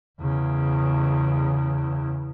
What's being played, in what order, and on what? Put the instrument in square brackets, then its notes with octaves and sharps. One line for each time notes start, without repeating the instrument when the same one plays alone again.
[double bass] E2 C#3